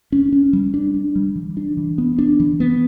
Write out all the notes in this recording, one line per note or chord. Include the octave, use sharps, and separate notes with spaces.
C#4
C#4
G3
D4
D4
G3
E3
D4
E3
B3
D4
E3
B3